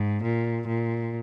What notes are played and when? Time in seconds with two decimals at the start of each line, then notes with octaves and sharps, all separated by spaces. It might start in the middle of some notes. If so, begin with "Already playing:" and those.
Already playing: G#2
0.22 A#2
0.67 A#2